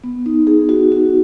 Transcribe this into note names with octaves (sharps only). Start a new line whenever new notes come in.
B3
D#4
G#4
F#4
F#4